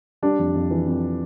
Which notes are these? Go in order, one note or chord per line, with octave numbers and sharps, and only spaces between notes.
G3 D4
F2
F2
E3
F2